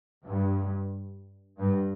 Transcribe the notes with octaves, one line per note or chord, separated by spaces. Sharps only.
G2
G2